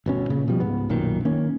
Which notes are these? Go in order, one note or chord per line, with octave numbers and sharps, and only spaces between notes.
G1 B2 C#4
A#2 C#3
B2 F3 G3
C#2 G#2 B3
B1 F#2 A#2 D#3
D#3 A#3 C#4